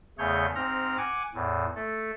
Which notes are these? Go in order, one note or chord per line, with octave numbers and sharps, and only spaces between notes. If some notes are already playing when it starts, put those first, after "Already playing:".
E2 C#3 A3 G#4 C#5 G6
G#2 C4 F6 A#6
F#5 G#5 D6
E2 A2
A3 A4